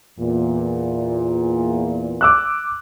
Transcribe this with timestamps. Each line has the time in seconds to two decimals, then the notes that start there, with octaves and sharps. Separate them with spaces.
0.20 E2 A#2
2.21 D6 E6 F#6